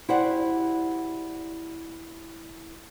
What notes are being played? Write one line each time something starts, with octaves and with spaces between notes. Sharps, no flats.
E4 F#4 G4 C5 D5 F#5